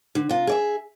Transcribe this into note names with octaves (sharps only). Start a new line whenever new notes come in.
D3
C3 F4
G#4 D5 E5